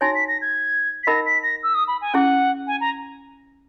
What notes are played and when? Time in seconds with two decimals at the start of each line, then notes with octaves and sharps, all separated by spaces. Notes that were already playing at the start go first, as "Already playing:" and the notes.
0.01 D#4 F#4 C#5 G#5 A#6
0.14 B6
0.28 A#6
0.41 G#6
1.03 B6
1.07 D#4 A#4 D#5 F#5 B5 A#6
1.25 B6
1.43 A#6
1.63 E6
1.74 D#6
1.87 B5
2.01 G#5
2.14 C#4 E4 G#4 F#5
2.67 G#5
2.80 A#5